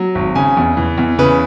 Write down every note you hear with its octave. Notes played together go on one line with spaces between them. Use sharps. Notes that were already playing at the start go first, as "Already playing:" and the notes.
Already playing: F#3
G#1
C#3 G#5
E2
E3
E2
C#3 B4